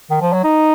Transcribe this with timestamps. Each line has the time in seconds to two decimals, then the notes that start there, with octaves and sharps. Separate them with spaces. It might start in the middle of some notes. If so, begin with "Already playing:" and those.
0.10 D#3
0.21 F3
0.33 F#3
0.44 D#4